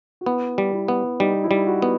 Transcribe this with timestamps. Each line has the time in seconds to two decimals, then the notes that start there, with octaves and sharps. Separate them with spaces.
0.21 F#4
0.26 B3 E4
0.58 G3
0.74 E4
0.88 B3
1.20 G3 D#4
1.44 E4
1.51 G3
1.67 F#4
1.82 B3